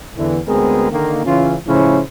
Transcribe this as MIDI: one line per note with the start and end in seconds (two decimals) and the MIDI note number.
0.17 0.39 40
0.17 0.39 50
0.17 0.39 52
0.47 0.89 38
0.47 0.89 56
0.47 0.89 59
0.47 0.89 60
0.47 0.89 68
0.47 0.89 70
0.91 1.22 50
0.91 1.22 51
0.91 1.22 58
1.26 1.55 49
1.26 1.55 52
1.26 1.55 61
1.26 1.55 65
1.67 2.00 45
1.67 2.00 49
1.67 2.00 53
1.67 2.00 61
1.67 2.00 64
1.67 2.00 72